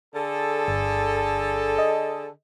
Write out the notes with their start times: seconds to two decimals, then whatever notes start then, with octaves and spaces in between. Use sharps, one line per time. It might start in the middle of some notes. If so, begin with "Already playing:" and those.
0.15 D3 G#4 A4
0.68 G1
1.78 D#5